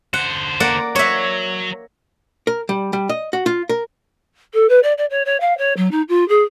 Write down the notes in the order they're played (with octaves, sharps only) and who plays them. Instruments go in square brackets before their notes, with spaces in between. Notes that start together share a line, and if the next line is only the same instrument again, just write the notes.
[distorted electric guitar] D3 C5 [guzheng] F#5
[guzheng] A#3 D5 F#5
[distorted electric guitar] F#3 [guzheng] C#5 E5
[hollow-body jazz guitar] A#4
G3
G3
D#5
F#4
F4
A#4
[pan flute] A4
B4
D5
D5
C#5
C#5
F5
C#5
F#3
D#4
F4
G#4